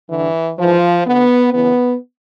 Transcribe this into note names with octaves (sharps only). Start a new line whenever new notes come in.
G2 D3 E3
G#2 E3 F3
D2 D3 B3
F#2 C#3 E3 B3